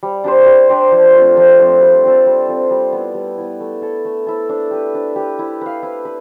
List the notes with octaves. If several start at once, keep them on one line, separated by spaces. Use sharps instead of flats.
G3
D4 G4 C5
G3
D4 G4 C5
F3
A3 C4 F4
F3
A3 C4 F4
G3
C4 F4 A4
G3
C4 F4 A4
G3
B3 E4
G3
B3 E4
A3
E4 A4
A3
E4 A4
D4
G4 B4
D4
G4 B4
E4
B4 F5
E4
B4